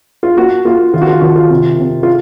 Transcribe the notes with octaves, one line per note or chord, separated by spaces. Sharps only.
F4
A#3 F#4
A#3 F4
D#3 F4
F#4
F4
D#3 F#4
F4
C3
C3
F4